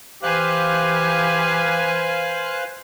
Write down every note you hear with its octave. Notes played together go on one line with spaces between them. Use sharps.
E3 G4 B4 C5 F5 G#5 F#6